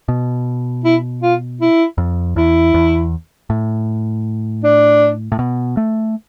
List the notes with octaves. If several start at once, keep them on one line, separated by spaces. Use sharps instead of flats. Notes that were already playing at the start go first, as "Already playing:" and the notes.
B2
E4
F4
E4
F2
E2 E4
E2
A2
D4
A2
B2
A3